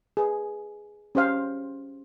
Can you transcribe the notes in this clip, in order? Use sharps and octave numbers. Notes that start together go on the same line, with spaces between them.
G#4 B4
C#4 G4 C5 F5